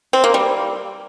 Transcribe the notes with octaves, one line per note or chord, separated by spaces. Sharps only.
C4
A#3
G3